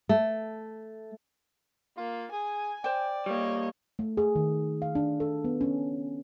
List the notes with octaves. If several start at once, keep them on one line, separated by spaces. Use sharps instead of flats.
A3
A#3 F4
G#4 G#5
C5 D5 G5
G3 A#3 C#5 D#5
A3
G#4
D#3
F5
D4
A4
B3
C#4